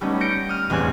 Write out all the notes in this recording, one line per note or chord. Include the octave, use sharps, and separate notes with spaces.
G3 A3 B3 C#4 D#4
G6 A#6 C#7 D7
D#6 F6
E1 A1 C4 G#5 F#6